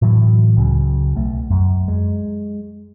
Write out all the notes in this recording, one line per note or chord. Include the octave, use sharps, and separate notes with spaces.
A2 D3 E3 F#3
C#2 C#3 F#3
B1 A3
F#2
G#3